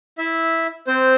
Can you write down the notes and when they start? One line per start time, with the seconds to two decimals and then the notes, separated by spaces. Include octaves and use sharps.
0.18 E4 E5
0.87 C4 C5